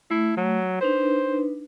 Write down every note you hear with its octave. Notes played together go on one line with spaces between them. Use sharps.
A3 E4
F#3
D4 D#4 B4 C5